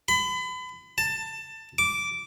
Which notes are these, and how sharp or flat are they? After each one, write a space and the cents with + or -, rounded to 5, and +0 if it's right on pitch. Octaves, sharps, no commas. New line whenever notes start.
B5 +35
A5 +20
D6 -10